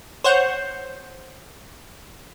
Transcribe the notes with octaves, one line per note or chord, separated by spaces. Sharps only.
C5 C#5 F#5 G6